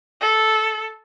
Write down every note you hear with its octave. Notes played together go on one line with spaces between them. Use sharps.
A4